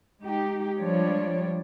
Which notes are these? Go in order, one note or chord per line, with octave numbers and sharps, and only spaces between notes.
G#3 D#4 G4
F3 G3 G#3 D4 C#5 D5